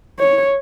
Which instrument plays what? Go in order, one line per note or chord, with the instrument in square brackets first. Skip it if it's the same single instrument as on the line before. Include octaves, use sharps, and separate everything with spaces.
[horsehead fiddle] C#5